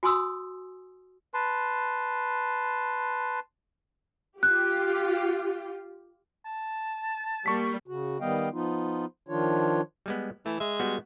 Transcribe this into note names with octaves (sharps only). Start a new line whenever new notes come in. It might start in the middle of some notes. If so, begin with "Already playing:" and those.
F#4 G#5 C6 D#6 E6
B4 A5 C6
F4 G4 F#6
A5
G3 A#3 C#6 B6
C#3 F#4
D#3 G3 B3 D#5 F5 G5
F3 B3 D#4 F4
D#3 F3 D4 F4 C#5
G3 G#3 B3
E3 A3
G#3 E5
G3 B3 F#4